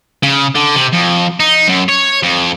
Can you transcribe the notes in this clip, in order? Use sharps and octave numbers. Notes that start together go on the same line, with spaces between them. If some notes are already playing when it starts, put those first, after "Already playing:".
C#3
D3
C3
F2
D#4
F#2
C#5
F2